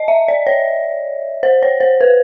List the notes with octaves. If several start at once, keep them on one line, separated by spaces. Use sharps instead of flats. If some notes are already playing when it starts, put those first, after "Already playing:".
Already playing: D#5
E5
D5
C#5
C5
C#5
C5
B4